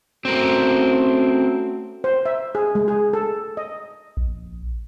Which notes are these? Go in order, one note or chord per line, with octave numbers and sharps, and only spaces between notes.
A3 C4 C#4 F#4 A#4
C5
E5
G#4
G#3
G#4
A4
D#5
A#1